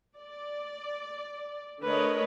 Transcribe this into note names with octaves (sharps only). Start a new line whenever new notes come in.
D5
D3 A3 A#4 B4 C#5 D#5